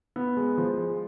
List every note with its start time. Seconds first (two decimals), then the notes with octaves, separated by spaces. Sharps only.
0.16 B3
0.37 G#3
0.58 F3
0.77 G#3